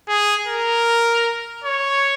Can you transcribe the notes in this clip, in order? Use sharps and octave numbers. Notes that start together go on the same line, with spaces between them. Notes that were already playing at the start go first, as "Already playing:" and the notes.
G#4
A#4
C#5